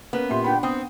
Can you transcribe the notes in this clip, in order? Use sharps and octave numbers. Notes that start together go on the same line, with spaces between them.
A#3 B3 C#4 B4
A#2 G4 E5 C6
D4 F#5 G5 B5
B3 C4 G5 D#6